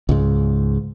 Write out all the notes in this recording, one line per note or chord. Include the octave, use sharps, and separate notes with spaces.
C#2 G#2